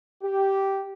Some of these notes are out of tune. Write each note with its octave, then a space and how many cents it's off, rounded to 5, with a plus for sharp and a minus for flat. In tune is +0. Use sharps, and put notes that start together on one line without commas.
G4 -10